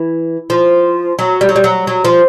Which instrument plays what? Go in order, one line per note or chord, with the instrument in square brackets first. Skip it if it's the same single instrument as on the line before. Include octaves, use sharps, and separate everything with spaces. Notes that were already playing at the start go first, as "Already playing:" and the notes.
Already playing: [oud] E3
F3
F#3
G3
F#3
G3
F#3
F#3
F3